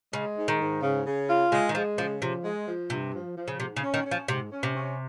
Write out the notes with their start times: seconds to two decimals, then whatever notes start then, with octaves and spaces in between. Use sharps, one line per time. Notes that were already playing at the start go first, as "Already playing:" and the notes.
0.13 C#3 G#3
0.37 G#2
0.48 D#3
0.61 G#2
0.82 C#3
1.06 C#3
1.29 F4
1.52 C#3 G#3
1.69 D#3
1.75 F3 G#3
1.98 C#3 F3
2.21 C3 F3
2.44 G#3
2.68 F3
2.90 G2 C3
3.14 F3
3.37 F3
3.48 C#3
3.60 G#2 C3
3.76 C#3
3.83 C#4
3.94 D#3
4.05 C#4
4.11 F3
4.28 G#2 C3
4.52 C#4
4.63 C3
4.75 C#4